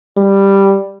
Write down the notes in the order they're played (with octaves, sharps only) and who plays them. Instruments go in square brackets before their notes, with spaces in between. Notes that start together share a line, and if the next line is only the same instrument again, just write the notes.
[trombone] G3